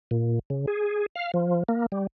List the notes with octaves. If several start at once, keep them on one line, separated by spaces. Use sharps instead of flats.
A#2
C#3
G#4
F5
F3
A#3
G3